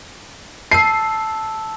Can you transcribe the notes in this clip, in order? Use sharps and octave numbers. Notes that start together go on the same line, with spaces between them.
A5 E6 C7